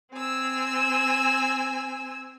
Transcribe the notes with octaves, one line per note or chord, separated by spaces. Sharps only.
C4 G#5 E6